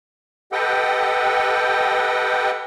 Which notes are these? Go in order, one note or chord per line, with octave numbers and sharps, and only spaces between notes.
G4 A4 B4 D#5 F#5 G5